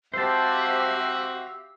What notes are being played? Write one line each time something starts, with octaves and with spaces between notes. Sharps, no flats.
C4 F#4 G4 C5 E5 F5 A5 E6